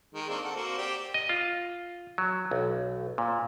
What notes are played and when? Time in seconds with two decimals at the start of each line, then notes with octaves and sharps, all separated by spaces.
0.14 D#3 G#3
0.29 A#3 C4 D4
0.44 A4 F#5
0.56 A#3 C4 F#4
0.78 G4 C5 D5
1.14 D#5
1.29 F4
2.18 F#3
2.51 B1
3.18 A#2